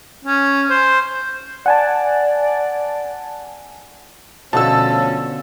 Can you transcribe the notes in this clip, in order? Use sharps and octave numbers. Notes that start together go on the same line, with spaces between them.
C#4
C5
D5 F#5 G#5 A5
D2 B2 D3 F3 C#4 A5 E6